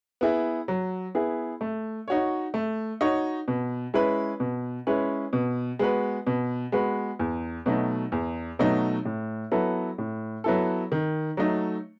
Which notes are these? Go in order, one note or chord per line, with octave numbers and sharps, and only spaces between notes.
B3 E4 G#4
F#3
B3 E4 G#4
A3
D#4 F#4 C#5
A3
D#4 F#4 C#5
B2
G#3 C#4 E4 B4
B2
G#3 C#4 E4 B4
B2
G#3 B3 F#4 B4
B2
G#3 B3 F#4 B4
E2
B2 F#3 A3 D#4
E2
B2 F#3 A3 D#4
A2
F#3 B3 E4 A4
A2
F#3 B3 E4 A4
D#3
F#3 A3 D#4